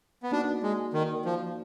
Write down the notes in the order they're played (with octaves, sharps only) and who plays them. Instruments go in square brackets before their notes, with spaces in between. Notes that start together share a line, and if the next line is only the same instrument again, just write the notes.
[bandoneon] B3
[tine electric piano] A#3 D#4 F#4 D5 [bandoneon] D4
[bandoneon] G#3
D#3
F3